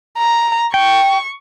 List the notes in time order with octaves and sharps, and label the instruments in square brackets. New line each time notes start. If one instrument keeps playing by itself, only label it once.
[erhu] A#5
[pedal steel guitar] G5 [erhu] C#6